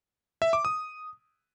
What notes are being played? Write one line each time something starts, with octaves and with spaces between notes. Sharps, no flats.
E5
D6
D#6